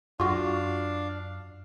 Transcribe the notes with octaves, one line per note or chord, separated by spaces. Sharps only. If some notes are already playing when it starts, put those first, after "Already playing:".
F#2 D4 F4 F#4 F5